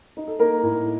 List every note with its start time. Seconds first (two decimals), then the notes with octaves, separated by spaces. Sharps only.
0.17 D#4
0.28 A4
0.39 A#3 D#4 A#4
0.63 A2